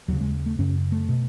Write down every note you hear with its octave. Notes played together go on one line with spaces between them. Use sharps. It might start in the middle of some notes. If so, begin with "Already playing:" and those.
D#2 C#3 F#3
G#3
A3
F#2 C#3 C#4
A3
B2